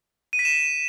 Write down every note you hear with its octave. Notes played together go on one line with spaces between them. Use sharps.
D#7
B6
E7